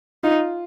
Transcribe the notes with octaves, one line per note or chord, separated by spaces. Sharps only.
D#4 F4